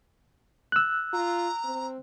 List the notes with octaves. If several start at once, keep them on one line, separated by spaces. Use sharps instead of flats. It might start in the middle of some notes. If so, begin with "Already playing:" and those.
E6 F#6
F4 A#5
C4